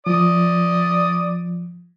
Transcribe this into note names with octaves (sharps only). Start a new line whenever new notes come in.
F3 D5 D#6